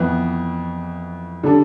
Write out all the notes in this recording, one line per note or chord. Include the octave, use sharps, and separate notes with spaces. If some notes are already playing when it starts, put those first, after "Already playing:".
Already playing: F2 E3 B3 E4 B4
D3 G3 D4 A4